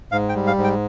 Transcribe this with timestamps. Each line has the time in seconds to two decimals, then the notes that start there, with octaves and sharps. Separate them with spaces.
0.12 G#2 F5
0.29 G5
0.35 G3
0.47 F5
0.58 G#2
0.64 G5